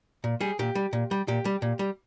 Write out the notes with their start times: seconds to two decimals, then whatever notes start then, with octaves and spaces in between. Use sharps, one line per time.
0.24 A#2
0.41 G3 G#4
0.59 A#2 G4
0.75 G3
0.93 A#2
1.11 G3
1.28 A#2 G4
1.45 G3
1.62 A#2
1.79 G3